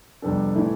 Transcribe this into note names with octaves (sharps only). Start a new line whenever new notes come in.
F2 C3 G3 B3 D4 A4
A2 E3 A3 E4